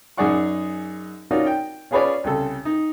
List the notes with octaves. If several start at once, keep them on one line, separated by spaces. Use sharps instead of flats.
F#2 D#4 G#4 D5 F#5 C#6
C#4 D#4 F4 F#4 A#4 D5
G5
C#4 F4 G#4 B4 C#5 D5
C2 C#3 A4
D#4